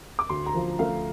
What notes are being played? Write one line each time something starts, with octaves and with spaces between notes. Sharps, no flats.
D6
D2 C6
A#5
F3
A3 F5